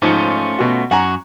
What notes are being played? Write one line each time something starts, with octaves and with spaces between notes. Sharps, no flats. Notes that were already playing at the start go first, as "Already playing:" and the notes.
G#2 F3 A3 C#4 F4
B2 F#4
F#2 F#4 F#5 G#5 A#5